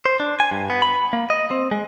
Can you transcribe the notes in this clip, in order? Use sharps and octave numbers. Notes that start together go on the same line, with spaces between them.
C5
D4
G#5
G2
B3
B5
A#3
D#5
C4
G#3